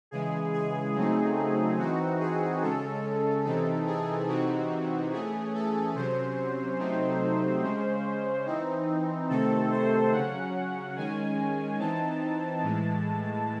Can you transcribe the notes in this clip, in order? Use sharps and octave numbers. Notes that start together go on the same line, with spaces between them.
C#3 E3 G#3 G#4
G#4
C#3 F#3 A3 C4 D#4
E3 C4 D#4 F#4
G#4
C#3 G#3 C#4 A4
C3 E3 C4 D#4 A4
G#4
C3 E3 C4 D#4 F#4
E3 A3 C#4 G#4
A4
C3 F#3 C#4 C5
C3 F#3 A3 C4 D#4
C#3 G#3 C#4
E3 C4 D#4
C3 D#3 A3 C4 A4
C5
C#3 F#3 C#4 F#5
D#3 G#3 C#4 G#5
E3 C4 D#4 A5
A2 E3 G#3